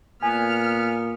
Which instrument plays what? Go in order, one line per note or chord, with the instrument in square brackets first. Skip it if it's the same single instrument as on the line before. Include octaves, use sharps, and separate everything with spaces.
[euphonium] A#2 [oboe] B3 [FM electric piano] G#5 [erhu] F6